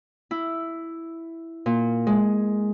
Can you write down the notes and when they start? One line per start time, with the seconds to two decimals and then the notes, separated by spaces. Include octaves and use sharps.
0.31 E4
1.66 A#2
2.07 G#3